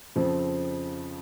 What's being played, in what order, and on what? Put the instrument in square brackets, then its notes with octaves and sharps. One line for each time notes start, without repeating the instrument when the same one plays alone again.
[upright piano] F2 C#3 F3 C4